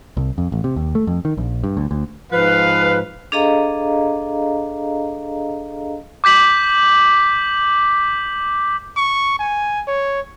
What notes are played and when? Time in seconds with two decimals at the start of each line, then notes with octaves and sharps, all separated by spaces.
0.17 C2
0.38 F2
0.52 A1
0.64 C3
0.76 D#2
0.95 A3
1.07 F2
1.25 D#3
1.37 A#1
1.64 G2
1.77 D2
1.91 D2
2.32 G#2 F3 B4 F5
3.32 D4 G#4 A4 D#5 F5 A#5
6.24 D6 G6 B6 F#7
8.97 C#6
9.39 G#5
9.87 C#5